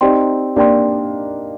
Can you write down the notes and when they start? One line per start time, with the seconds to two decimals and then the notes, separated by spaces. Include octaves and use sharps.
0.01 C4 D#4 G4 D5 G5 C6
0.56 A#3 D4 G4 D5 G5 C6